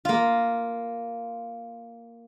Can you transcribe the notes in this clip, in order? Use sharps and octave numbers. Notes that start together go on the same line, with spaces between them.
A#3 F4